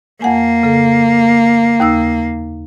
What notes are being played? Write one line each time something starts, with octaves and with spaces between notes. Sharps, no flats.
F2 A#3 F#5 G#5
C#3 A4
D#2 D#4 E6